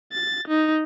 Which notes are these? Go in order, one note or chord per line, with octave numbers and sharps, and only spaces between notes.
A6
D#4